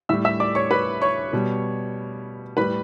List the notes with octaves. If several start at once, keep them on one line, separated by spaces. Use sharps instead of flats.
A2 G3 E5 E6
E5 E6
D5 D6
C#5 C#6
B4 B5
C#5 C#6
B2 G3
A2 G3 B4 B5